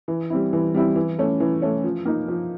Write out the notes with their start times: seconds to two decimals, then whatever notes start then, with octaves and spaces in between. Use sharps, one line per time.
0.08 E3
0.30 G3 C4 E4
0.53 E3
0.74 G3 C4 E4
0.96 E3
1.19 A3 C#4
1.40 E3
1.62 A3 C#4
1.84 F3
2.05 A#3 D#4
2.28 F3